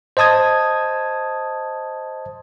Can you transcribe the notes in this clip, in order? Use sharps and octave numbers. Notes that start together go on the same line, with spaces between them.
C5 D#5 A5 D#6 G#6